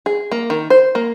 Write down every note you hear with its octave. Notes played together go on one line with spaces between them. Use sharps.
G#4
A#3
D#3
C5
A#3